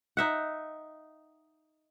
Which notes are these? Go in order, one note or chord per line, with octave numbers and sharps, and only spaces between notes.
D#4 E5 F#5